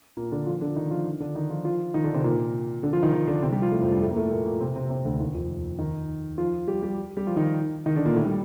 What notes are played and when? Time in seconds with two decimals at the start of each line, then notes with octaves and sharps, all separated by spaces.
0.17 A#2 A#3
0.32 D3 D4
0.47 F3 F4
0.61 D3 D4
0.76 D#3 D#4
0.91 F3 F4
1.20 D3 D4
1.35 D#3 D#4
1.50 F3 F4
1.65 F3 F4
1.94 D#3 D#4
2.04 D3 D4
2.14 C3 C4
2.24 A#2 A#3
2.83 D3 D4
2.93 F3 F4
3.03 D#3 D#4
3.13 D#3 D#4
3.27 D3 D4
3.42 C3 C4
3.52 G3 G4
3.62 F3 F4
3.71 A2 A3
3.81 F2 F3
3.91 G2 G3
4.01 A2 A3
4.10 A#3
4.16 A2 A3
4.31 A#2 A#3
4.45 A#2 A#3
4.60 C3 C4
4.76 C3 C4
4.90 C3 C4
5.05 D2 D3
5.20 D#2 D#3
5.35 F2 F3
5.79 D#3 D#4
6.38 F3 F4
6.68 G3 G4
6.83 G3 G4
7.17 G3 G4
7.27 F3 F4
7.36 D#3 D#4
7.86 D#3 D#4
7.96 D3 D4
8.05 A#2 A#3
8.15 A2 A3
8.25 G3